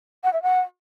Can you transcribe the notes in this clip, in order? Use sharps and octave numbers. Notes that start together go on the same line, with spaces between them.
F#5
E5
F#5